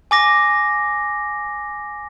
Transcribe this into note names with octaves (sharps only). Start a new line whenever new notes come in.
G#5 D6 A#6